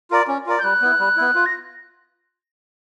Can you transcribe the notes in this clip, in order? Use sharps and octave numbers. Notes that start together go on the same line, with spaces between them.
F4 A#4 D5
C#4
F4 A#4 D5
G6
G3 F#6
B3 E4
G3
B3 E4
F4
A#6